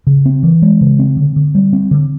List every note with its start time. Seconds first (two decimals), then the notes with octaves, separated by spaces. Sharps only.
0.07 C#3
0.26 C4
0.43 E3
0.62 G#3
0.81 C#3
0.99 C4
1.17 D3
1.36 D3
1.55 G3
1.73 C4
1.91 D3